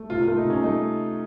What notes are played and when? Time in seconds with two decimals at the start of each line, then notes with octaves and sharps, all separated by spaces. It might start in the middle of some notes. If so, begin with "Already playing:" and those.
Already playing: A3
0.10 C3 F4
0.23 A3 F4
0.38 D#4
0.45 C3 C#4
0.63 A3 D#4